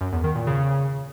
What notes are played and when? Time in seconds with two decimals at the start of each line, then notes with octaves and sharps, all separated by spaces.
0.01 F#2
0.12 E2
0.24 D#3
0.35 A#2
0.47 C#3